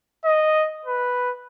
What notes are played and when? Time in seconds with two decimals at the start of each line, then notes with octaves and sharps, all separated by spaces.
0.25 D#5
0.85 B4